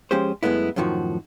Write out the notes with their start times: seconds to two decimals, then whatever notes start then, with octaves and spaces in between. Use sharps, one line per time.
0.11 F3 G#3 C#4 G4 G#4 C5
0.43 F#2 G#3 A3 B3 E4
0.76 F#2 A2 D#3 F3 F#4